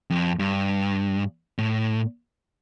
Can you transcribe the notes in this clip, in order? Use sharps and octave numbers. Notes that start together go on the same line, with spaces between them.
F2
G2
A2